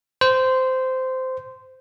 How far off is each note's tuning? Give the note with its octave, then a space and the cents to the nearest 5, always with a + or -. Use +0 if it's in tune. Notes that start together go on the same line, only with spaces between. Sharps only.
C5 -15